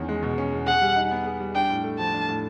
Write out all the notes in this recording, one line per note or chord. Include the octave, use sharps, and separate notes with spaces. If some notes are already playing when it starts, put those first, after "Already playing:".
Already playing: E2 D#3 C#4
G#3
B2
C#4
E2
G#4 F#5
G3
D#4
B3
G#4
G3
D4 G5
A2
A3
F3 A5
D4
A2